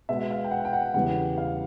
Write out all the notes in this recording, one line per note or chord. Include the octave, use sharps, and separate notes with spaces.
B2 G#3 B3 E5
F5
G5
F#5
G5
F#5
E2 C#3 E3 G3 B3 F#5
F5